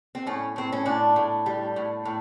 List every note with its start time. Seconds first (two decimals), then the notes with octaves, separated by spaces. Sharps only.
0.15 C4
0.26 A2 C#4
0.56 A2 C4
0.72 C#4
0.85 A2 D4
1.16 A2
1.46 G3
1.76 A2
2.05 A2